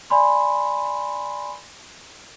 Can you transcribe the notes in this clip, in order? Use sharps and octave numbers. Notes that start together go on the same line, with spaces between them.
D5 G#5 B5 C6